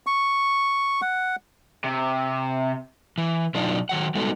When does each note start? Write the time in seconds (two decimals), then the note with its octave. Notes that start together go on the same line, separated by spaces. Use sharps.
0.07 C#6
1.02 F#5
1.84 C3
3.18 E3
3.54 B2 F#3 D4 D#4 F4
3.89 D#3 F#3 F#5
4.15 G3 G#3 B3 D#4 F#4 A4